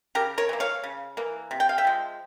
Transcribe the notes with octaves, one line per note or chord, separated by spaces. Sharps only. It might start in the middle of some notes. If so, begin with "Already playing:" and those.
C#3 G4 A#4
A#4 C#5
E3 A#3
C#5 F5
C#3
E3 A#3
C3
G5
F5
E5 G5
F3 G#3